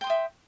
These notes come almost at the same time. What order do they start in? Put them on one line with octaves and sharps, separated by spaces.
G5 C6 D#6 E5